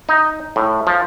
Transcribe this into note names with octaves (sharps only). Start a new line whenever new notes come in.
D#4
A2
F3